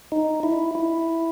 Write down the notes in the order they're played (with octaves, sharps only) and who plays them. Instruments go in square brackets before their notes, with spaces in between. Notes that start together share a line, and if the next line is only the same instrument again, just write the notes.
[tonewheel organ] D#4
E4
E4